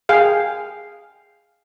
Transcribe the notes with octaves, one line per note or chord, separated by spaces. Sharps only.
G#4 F5 G5